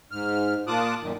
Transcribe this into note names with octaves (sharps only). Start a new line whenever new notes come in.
G#2 F6
A#2 F4 A5 D6 D#6 F#6
F#2 A#2 D#3